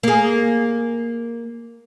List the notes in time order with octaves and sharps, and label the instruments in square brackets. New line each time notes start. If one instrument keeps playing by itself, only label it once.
[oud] A#3 G#4